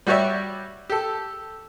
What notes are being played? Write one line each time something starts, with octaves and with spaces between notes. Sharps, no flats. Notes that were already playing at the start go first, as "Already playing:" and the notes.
G3 F#4 G4 C#5 D5 E5
G4 A4